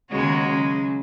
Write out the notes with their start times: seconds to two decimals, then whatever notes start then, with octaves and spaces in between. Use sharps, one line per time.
0.11 D#2 C#3 G#3 B3 F#4 C#5
0.48 C#3 F#3 C#4